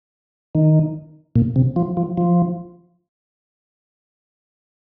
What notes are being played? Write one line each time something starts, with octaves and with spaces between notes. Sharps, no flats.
D#3
A#2
C3
F3
F3
F3